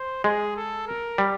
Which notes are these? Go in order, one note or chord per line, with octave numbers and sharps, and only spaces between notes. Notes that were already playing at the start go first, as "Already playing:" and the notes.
Already playing: C5
G#3 G#4
A4
A#4
G3